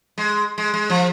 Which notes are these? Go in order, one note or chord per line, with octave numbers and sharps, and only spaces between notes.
G#3
G#3
G#3
F3